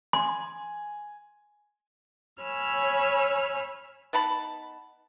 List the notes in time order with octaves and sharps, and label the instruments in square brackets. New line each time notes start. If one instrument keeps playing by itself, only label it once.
[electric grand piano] G#5 [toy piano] C6
[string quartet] C#5 G#5 B5 E6 F6
[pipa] B3 D#4 A5 B5